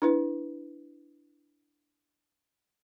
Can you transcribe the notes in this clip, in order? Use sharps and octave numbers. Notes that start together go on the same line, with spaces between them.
D4 E4 B4